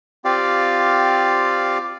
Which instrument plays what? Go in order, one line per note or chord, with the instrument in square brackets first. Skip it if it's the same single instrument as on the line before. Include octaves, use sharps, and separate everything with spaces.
[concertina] C4 F4 G4 D5 F5